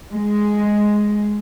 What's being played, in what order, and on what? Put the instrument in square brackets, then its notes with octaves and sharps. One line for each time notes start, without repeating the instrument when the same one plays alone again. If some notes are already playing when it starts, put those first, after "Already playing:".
[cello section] G#3